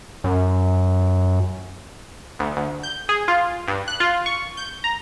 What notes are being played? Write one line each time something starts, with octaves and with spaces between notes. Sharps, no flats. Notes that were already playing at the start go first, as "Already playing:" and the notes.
F#2
D2
D2
G6
G#4
F4
G2
F#6
F4
C#6
G6
A#5